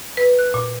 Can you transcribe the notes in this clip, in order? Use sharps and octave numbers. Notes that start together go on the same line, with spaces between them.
B4
F#6
A#2